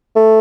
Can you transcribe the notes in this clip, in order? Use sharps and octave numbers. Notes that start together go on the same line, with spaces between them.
A3